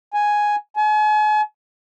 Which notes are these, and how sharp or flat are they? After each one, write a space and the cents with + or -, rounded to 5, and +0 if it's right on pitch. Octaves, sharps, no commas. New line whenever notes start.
G#5 +0
G#5 +40